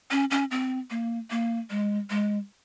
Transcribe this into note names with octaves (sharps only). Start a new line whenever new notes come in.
C#4
C#4
C4
A#3
A#3
G#3
G#3